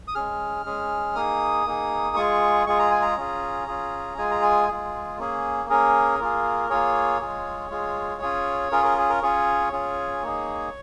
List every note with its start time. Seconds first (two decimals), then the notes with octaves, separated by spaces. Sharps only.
0.08 D#6
0.15 G#3 C#4 G#4 F6
0.66 G#3 C#4 G#4
1.15 A#3 D#4 G#4 D#6
1.66 A#3 D#4 G#4
2.16 G#3 F4 G#4 C#6
2.67 G#3 F4 G#4 C#6
2.79 A#5
2.91 G#5
3.02 A#5
3.17 C#4 F4 G#4
3.67 C#4 F4 G#4
4.18 G#3 F4 G#4 G#5
4.31 A#5
4.43 G#5
4.68 G#3 F4 G#4
5.19 A#3 C#4 G#4
5.69 A#3 C#4 G#4 A#4
6.20 A#3 F4 G#4
6.70 A#3 F4 G#4 C#5
7.21 G#3 F4 G#4
7.71 G#3 F4 G#4
8.22 C#4 F4 G#4
8.72 C#4 F4 G#4 A#4
8.84 A#4
8.98 G#4
9.09 A#4
9.23 C#4 F4 G#4 C#5
9.72 C#4 F4 G#4
10.23 A#3 D#4 G#4